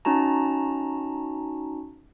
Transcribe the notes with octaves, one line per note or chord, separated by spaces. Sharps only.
C#4 D#4 F#4 A5 A#5